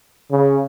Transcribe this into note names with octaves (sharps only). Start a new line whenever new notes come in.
C#3